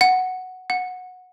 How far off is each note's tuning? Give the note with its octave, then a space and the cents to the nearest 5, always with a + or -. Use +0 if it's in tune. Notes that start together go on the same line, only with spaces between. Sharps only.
F#5 +0
F#5 -15